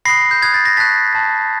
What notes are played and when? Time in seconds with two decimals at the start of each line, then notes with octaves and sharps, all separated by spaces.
0.05 B5 D#6 F#6 A#6 C7
0.31 G6
0.41 B5 D#6 F#6 G#6
0.54 A6
0.65 A#6
0.77 A5 C#6 F#6 A6 B6
1.13 A5 C#6 F#6